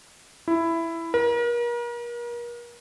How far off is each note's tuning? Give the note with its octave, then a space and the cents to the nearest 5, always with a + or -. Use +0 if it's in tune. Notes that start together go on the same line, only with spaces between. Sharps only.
E4 +10
A#4 +40